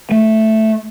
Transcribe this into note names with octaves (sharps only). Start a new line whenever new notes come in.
A3